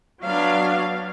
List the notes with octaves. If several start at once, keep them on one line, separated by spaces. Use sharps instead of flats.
F#3 B3 D4 F5